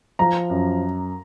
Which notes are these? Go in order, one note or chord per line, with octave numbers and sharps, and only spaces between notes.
F3 A#5
F#2